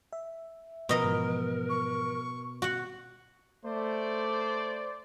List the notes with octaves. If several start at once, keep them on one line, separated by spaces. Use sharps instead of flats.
E5
B2 F3 B3 A#4 D#5 A#5
G#2 E3 F3
C#6
F#4 F#5
A3 C5 D5